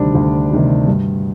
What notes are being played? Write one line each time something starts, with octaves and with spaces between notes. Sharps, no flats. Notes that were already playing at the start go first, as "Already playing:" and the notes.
Already playing: D2 C3 D#3 G3 C4 D4 D5
D2
C3 D#3 G3
G2